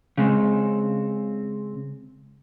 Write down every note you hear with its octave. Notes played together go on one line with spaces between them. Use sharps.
C#3 G#3 C4